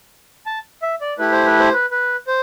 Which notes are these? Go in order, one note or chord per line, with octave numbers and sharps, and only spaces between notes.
A5
E5
D5
A3 E4 G4 B4
C5
B4
C5
B4
B4
C5